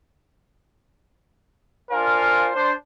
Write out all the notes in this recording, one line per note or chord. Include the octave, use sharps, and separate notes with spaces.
D4 F4 A#4 C5 F5 G#5
D4 C5